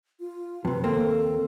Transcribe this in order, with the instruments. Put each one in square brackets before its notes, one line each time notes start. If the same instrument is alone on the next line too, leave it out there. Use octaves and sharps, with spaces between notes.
[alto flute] F4
[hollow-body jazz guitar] F2 C3 [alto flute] B4
[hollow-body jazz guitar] D#2 A#3 C4 [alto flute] A4